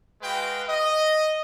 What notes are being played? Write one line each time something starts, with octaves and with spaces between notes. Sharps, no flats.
G#3 F#4 B4 F5 G5
D#5